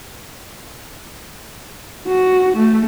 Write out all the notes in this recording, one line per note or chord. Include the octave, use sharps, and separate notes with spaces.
F#4
A3